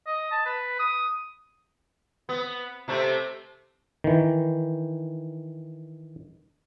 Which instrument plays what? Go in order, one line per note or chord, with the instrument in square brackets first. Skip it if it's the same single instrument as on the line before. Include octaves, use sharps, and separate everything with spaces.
[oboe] D#5
A5
B4
D#6
[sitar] B3
C3 A3 C4
[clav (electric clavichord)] D#3 E3